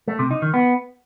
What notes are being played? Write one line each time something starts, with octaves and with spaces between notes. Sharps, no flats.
A3
C3
D#4
D#3
B3